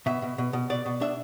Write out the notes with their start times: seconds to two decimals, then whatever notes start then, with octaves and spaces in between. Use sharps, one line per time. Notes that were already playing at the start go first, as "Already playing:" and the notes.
0.06 B2 E5
0.22 B2
0.38 B2
0.53 B2
0.70 B2 D5
0.86 B2
1.01 D4 E5